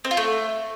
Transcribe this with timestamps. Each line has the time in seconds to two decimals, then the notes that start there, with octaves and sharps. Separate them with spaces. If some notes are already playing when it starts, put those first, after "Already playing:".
0.05 C4
0.11 F4
0.17 A3